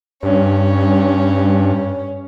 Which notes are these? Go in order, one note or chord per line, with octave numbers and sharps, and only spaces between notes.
G2 C#4